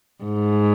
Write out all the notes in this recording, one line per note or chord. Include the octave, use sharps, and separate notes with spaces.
G#2